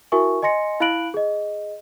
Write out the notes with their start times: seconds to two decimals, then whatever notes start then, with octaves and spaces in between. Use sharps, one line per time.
0.12 E4 F#4 A#4 E5 G#5 C#6
0.43 D#5 G#5 C6 A#6 C#7
0.80 E4 F5 B5 F#6 D7 F#7
1.14 G#4 D#5